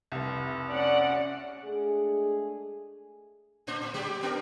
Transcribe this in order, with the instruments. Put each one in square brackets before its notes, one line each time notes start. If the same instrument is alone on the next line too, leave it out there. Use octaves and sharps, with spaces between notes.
[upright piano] F1 C2
[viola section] C#4 D5 F#5
[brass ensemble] G#3 A3 D4 G#4
[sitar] A2 D4 C5
A2
F#3 G#3 G4
B3 D4 A#4